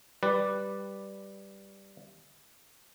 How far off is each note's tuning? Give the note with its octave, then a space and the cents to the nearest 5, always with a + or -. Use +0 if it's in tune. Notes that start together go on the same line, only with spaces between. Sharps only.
G3 +0 B4 +0 D5 +0